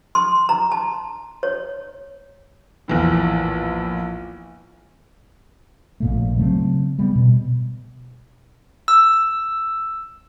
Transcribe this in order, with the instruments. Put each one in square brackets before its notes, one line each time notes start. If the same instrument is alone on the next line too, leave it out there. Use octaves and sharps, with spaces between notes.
[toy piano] C6
A#5
A5
C#5
[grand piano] A#1 E2 A2
[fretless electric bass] A#1 A#2 A3
C#3 F#3 A3 C4
G3 B3
B2
[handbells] E6